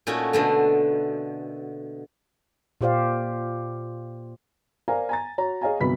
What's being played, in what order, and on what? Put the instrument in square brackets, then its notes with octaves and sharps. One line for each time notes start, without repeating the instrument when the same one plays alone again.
[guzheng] A#2 A3 C#4 D#4 F#4
B2 D3 A3
[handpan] A#2 F4 G4 C5 D5 F5
[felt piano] A#4 C5 D5 F5 G#5 A#5
G#5 A#5 A6
F#4 C#5 A#5
G#4 C#5 D#5 F5 G#5 A#5
G1 C2 F#3 B4 B5 B6